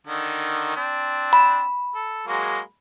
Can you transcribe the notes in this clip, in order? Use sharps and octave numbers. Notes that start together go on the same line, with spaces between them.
D3 D#3
C4 D4
B5
A4
F#3 G#3 A#3